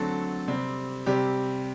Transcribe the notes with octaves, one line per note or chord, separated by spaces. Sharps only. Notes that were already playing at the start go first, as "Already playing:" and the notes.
Already playing: D3 F#3 A3 C4 A4
C3 G3 C4
C3 G3 C4 G4